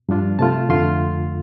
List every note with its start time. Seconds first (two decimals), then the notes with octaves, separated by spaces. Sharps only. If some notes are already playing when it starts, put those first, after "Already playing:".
0.09 G2 F3 D4 F4
0.39 C3 A3 F4 A5
0.69 F2 D3 A3 F4 C6